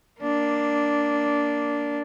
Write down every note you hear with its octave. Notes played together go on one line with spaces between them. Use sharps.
A#3 D4